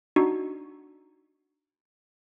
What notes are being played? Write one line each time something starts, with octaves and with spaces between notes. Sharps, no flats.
D4 D#4 F#4